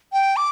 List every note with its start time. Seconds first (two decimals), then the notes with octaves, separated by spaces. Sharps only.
0.13 G5
0.37 D6